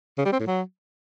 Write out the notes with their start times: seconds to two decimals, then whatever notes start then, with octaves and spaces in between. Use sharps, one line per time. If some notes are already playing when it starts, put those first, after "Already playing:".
0.18 C#3
0.25 G3
0.33 C4
0.40 A2
0.47 F#3